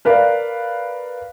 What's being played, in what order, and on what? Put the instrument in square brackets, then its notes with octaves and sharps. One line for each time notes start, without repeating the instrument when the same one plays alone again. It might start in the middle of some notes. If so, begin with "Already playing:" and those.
[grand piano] A#4 B4 D5 F5